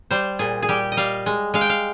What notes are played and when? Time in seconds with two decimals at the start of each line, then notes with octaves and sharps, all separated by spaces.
0.10 G3 C5
0.39 A#2 G#4
0.62 G#4
0.69 G3 G4
0.92 D#5
0.97 G3 F5
1.26 G#3
1.54 G#3 F5
1.61 G5
1.69 F5